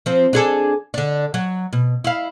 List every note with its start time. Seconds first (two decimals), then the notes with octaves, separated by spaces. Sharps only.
0.06 F3 C4
0.33 D4 G#4 A4
0.94 D3 D4
1.34 F#3
1.73 B2
2.04 E4 F5